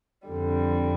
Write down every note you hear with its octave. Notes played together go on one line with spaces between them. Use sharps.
F2 D3 G3